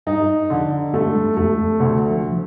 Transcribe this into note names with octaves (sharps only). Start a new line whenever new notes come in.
G2 D#4
F2 D3
G2 A3
G2
F2 A3
F2
D2 C3
F3
F3